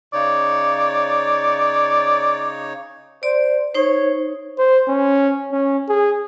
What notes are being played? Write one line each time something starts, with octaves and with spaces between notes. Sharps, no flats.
C#3 D#4 C#5 D5
C5 D5
D#4 C5 C#5
C5
C#4
C#4
G#4